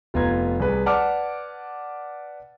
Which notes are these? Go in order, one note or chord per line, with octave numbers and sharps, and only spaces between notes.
F1 B3 F4 A#5 G#6
C2 G#4 B4
B4 D5 F#5 A5 D6 F6